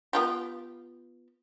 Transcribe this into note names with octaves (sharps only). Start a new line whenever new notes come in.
B3 F4 G4